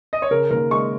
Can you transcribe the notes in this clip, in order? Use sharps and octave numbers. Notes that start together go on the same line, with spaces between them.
D#5
C#5
C#3 A#4
D#2 A#4
G#3 C#6